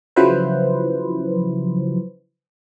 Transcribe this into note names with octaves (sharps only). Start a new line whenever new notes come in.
C#3 F3 F#3 E4 B4 C5